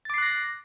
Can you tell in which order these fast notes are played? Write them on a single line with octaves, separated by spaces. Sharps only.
A6 D6 C7 F#6 A#6